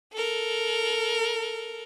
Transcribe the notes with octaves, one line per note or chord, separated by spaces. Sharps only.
A4 A#4